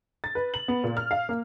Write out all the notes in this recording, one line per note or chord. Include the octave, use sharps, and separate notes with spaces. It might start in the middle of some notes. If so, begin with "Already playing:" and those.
A6
B4
F#7
B3
A#2
F6
F5
A#3